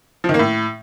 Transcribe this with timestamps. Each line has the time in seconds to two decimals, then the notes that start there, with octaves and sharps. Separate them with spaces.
0.24 F3
0.29 D#3
0.34 A#3
0.39 A2